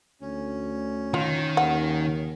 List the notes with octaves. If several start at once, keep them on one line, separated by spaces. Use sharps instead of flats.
D2 C#4
D#3 F4
D#2 F#5